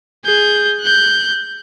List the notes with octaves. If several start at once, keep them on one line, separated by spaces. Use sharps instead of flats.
G#4 G6
F#6 G6